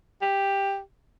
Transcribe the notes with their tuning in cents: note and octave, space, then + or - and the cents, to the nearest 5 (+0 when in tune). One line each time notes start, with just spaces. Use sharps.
G4 +10